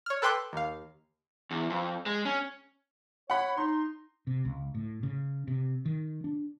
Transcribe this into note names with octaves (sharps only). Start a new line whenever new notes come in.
C#5 F6
A4 B4 G5 C6 D6 F#6
D#2 F5
E2
F2
G#3
C#4
C#5 F#5 B5
D#4 C6
C3
C#2
A2
C#3
C3
D#3
D4